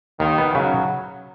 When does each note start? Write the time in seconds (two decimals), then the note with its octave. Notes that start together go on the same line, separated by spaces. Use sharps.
0.19 D#2 D#3
0.38 B3
0.55 C#3 F#3